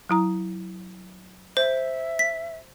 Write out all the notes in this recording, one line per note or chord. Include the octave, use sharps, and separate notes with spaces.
F#3 E4 A#5
C5 E5
B6